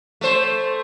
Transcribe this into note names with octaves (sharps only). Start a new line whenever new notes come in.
A3 C5